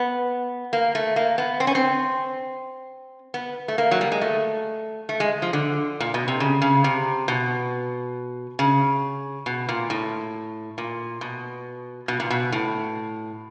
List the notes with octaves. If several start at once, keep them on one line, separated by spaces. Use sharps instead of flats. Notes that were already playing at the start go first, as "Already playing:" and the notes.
Already playing: B3
A#3
A3
A#3
B3
C4
C#4
C4
B3
A3
A#3
F#3
G3
G#3
A3
A3
G#3
F3
D3
A#2
B2
C3
C#3
C#3
C3
B2
C#3
B2
A#2
A2
A#2
B2
B2
A#2
B2
A2